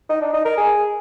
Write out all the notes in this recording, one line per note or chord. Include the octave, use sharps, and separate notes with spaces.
D#4
D4
D#4
A#4
G#4